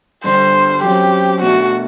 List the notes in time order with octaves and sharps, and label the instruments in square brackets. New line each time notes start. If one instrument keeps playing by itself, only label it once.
[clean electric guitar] G2 D3 G3 [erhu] C5
[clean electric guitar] F#2 F#3 C4 [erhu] G4
[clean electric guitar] B2 A3 D4 [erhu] F#4